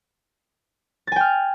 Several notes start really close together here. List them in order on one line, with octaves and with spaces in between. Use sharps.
A6 G#5 G5 F6